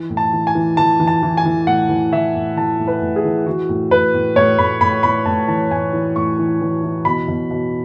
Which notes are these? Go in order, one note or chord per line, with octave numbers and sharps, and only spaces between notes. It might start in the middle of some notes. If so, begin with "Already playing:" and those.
Already playing: E3
A2
A5
E3
G#5
E3
E3 A5
E3
A5
E3
G#5
E3
A2 F#5
E3
E3 E5
A2
E3 A5
A2
B4
A2
G#4
E3
E3 F#4
A2
A2 B4
A2
A2 C#5
A2 B5
A2 B5
A2 B5
A2 A5
E3 A5
A2 G#5
E3
A2 C#6
E3
E3
E3
B2 B5
B2
B2